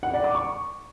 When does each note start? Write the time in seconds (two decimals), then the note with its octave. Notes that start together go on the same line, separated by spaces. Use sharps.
0.03 F#5
0.14 D5
0.24 D6
0.35 C#6